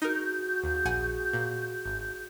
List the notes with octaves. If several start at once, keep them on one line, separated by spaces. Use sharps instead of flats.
D#4 F#4 G#4 A#4 G6
D#2
A#1 F#5 G#5
A#2
G#1